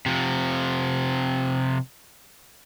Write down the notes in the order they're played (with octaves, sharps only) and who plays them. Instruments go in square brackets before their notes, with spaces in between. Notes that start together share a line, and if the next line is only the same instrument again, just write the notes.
[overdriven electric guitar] C3 F3